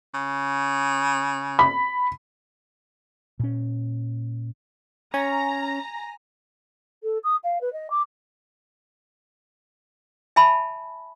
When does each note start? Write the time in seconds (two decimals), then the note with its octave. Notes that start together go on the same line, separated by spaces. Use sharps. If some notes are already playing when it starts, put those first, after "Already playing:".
0.14 C#3
1.59 B5
3.40 A#2 C#4
5.14 C#4 G#5 A#5
7.03 A4
7.24 D#6
7.44 F5
7.61 B4
7.73 D#5
7.90 D6
10.36 E5 G#5 A5 B5